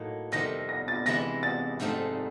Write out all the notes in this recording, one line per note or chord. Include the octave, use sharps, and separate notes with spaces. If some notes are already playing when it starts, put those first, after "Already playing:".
Already playing: A2 F#3 A#3 D#4 F#4
F2 C3 D#3 G3 C4 A#6
A#6
A6
C3 E3 G#3 C4 E4 A#6
A6
G#2 F3 A3 C4 D#4